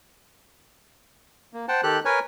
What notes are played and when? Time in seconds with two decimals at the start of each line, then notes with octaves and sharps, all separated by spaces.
1.53 A#3
1.68 C5 F#5 G5 A5
1.83 D#3 G4 A4 F#6
2.05 A#4 B4 C#5 G#5